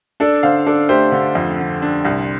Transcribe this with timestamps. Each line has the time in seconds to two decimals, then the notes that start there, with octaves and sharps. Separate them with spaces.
0.20 D4 A4 D5
0.43 D3 C5 F5
0.66 D4 A4 D5
0.89 A3 G4 C5
1.12 D3
1.35 F2
1.59 D3
1.82 D4
2.05 C2